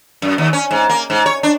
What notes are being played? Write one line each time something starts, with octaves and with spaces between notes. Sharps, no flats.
F#2
D#2
C#4
G#2
A#3
G#2
C#5
D4